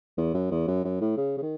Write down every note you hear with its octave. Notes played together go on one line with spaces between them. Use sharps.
E2
F#2
E2
F#2
F#2
A2
C#3
C#3
D#3